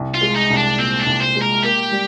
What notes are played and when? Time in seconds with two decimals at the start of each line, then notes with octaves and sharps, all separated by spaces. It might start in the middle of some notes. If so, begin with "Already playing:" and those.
Already playing: C2
0.14 F4
0.21 G#3
0.36 D#4
0.50 C2
0.57 D4
0.78 A#2 C4
1.00 D4
1.06 C2
1.20 C5
1.35 G#3
1.42 A#4
1.63 A#3 G4
1.91 G3